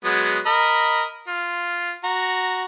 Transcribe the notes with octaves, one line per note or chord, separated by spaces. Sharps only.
F#3 G#3 B3
A#4 D#5 B5
F4
F#4 A#5